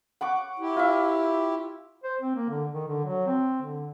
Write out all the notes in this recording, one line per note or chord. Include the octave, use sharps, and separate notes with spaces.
F#5 C#6 D6
E4 G4
F4 E5
C5
C4
A#3
D3
D#3
D3
F#3
C4
D3